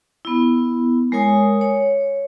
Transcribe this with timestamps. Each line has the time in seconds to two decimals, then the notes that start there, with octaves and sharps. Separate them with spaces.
0.25 B3 E4
1.12 G#3 A#4 C#5 G#5 D#6
1.61 C#5